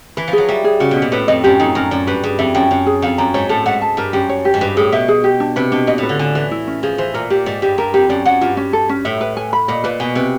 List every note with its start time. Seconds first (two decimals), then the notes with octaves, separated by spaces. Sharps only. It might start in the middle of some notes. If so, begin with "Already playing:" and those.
0.17 E3 B4
0.28 F3
0.33 F#3 G#4
0.48 G3 E5
0.64 G#4
0.80 C#3 F#4
0.91 B2
0.96 C#4
1.02 A#2
1.12 A2 B4
1.28 F2 D#5
1.44 F#2 G4
1.60 F2 D#4
1.75 F#2 A#4
1.91 F#2 D5
2.07 G2 B4
2.23 G2 G#4
2.39 F2 E5
2.55 F#2 G5
2.71 F#2 C#5
2.86 G#4
3.02 F2 F5
3.18 F#2 A#5
3.34 G#2 C#5
3.49 A2 A4
3.66 G#2 F#5
3.82 A5
3.97 G2 A#4
4.13 F#2 G4
4.29 C#5
4.45 G4
4.54 G#2
4.61 G2 B4
4.77 A2 G#4
4.92 B2 E5
5.08 G#4
5.24 G4
5.40 D4
5.56 C3 B4
5.72 B2 D4
5.87 A#2 D#5
5.98 A2
6.03 B4
6.09 D3
6.19 D3 G#5
6.35 E3 B4
6.51 E4
6.67 C#4
6.83 F3 G#4
6.98 E3 C5
7.14 A#2 A#4
7.30 A#2 G4
7.46 G#2 D5
7.62 G2 G4
7.78 G2 A#4
7.94 F2 G4
8.09 F#2 D5
8.25 F#2 F#5
8.41 G2 F4
8.57 C#4
8.73 A4
8.89 C#4
9.05 A2 E5
9.21 B4
9.37 G#5
9.53 B5
9.68 A#2 D#5
9.84 A#2 B4
10.00 B2 G#5
10.15 C3 B4